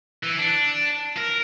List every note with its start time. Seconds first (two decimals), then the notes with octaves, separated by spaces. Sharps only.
0.23 E3
0.38 D4
1.18 A#4